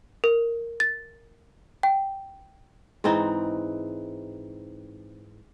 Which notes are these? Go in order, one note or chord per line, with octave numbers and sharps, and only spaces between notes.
A#4
A6
G5
G#2 E3 C4 D#4